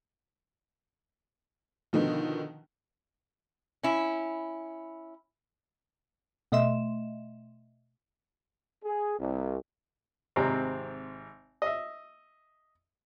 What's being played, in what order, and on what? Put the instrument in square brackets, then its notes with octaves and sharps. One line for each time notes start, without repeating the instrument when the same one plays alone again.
[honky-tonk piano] B2 D3 D#3 F3
[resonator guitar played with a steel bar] C#4 E4
[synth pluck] B2 A3 D#5 E5 C6 E7
[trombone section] G#4
C2
[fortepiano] G#1 C3 C4 A#5
D#5 E5